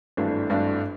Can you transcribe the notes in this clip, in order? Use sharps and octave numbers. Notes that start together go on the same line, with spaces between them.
G#1 G2 E3 A3 D4
G#1 G2 E3 A3 D4